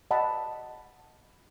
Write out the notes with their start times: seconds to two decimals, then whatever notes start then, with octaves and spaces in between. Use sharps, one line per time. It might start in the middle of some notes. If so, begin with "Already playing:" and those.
0.11 D#5 F#5 A5 B5